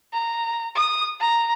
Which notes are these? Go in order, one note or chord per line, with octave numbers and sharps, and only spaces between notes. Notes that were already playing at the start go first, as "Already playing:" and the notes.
A#5
D#6
A#5